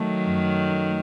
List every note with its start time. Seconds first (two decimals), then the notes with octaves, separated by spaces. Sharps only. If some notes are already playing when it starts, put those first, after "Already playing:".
Already playing: D#3 F#3 A3
0.26 F#2
0.69 D#4